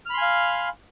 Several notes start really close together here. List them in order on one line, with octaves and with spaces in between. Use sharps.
F6 B5 C6 G#5 F5